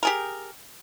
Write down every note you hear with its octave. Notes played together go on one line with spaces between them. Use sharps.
G4 G#4 A#4